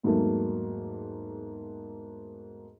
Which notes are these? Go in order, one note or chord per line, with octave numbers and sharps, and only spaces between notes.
E2 G#2 F#3 A3 A#3